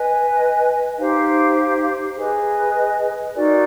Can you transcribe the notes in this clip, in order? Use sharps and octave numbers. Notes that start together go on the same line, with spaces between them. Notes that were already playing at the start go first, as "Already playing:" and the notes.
Already playing: B4 D#5 G#5
D#4 G4 C5 F5
G#4 B4 D#5 G#5
D#4 F#4 A#4 D5